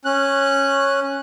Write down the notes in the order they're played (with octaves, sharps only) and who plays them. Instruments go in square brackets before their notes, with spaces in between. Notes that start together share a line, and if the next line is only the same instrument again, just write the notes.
[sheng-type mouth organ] C#4 F#6